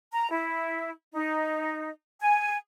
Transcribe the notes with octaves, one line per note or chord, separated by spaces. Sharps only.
A#5
E4
D#4
G#5